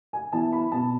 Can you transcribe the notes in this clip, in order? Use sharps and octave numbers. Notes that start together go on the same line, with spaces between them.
G#5
E3 B3 E4 A5
B5
B2 A5